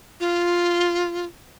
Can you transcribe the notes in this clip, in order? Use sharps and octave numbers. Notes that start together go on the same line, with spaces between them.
F4